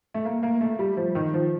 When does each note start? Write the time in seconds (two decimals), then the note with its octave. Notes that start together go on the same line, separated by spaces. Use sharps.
0.14 A3
0.25 A#3
0.43 A#3
0.61 A3
0.79 G3
0.97 F3
1.15 D#3
1.34 F3